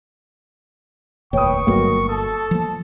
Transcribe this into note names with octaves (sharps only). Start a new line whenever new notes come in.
F1 D#2 A#2 B4 C#5 G5 C#6 D#6
G1 G2 F#3 A#3 D#5
A4 A5 D#6
F3 A#3